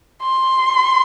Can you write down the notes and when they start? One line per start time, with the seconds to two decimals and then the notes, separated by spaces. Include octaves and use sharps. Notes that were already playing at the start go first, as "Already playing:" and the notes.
0.23 C6